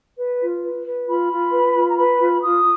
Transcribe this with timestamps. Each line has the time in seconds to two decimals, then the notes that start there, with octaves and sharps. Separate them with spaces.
0.17 B4
0.41 F4
0.63 B4
0.86 B4
1.07 F4 B5
1.31 F4
1.52 B4
1.75 F4
1.89 A#5
1.97 B4 B5
2.19 F4
2.42 F4 D#6